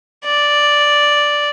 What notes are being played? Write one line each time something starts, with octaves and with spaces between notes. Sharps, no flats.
D5